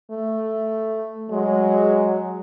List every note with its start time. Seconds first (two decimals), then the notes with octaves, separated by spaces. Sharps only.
0.11 A3
1.30 F#3 G#3